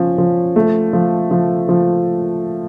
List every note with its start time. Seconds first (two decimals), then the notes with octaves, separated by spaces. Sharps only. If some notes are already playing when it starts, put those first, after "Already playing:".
Already playing: F3 C#4
0.18 F3
0.56 A3
0.93 F3
1.31 F3
1.69 F3